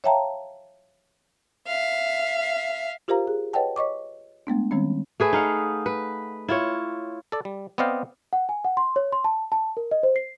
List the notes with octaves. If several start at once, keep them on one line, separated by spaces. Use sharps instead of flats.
C#5 E5 F5 G5 A5 A#5
E5 F5
F4 G4 A#4 C5 F5 A#5
G#4
B4 C#5 D#5 F#5 G5 A5
C#5 D#5 C#6 D6
G#3 A3 B3 D4
D#3 G3 G#3 C4 C#4
A3 G#4 B4
D#4 F5 F#5
B4
E4 F4 C#5
A4 D5
G3
B3 C4 D5 D#5 F5 G5
F#5
G#5
F#5
C6
C#5
C6
A5
A5
A#4
D#5
C5
C7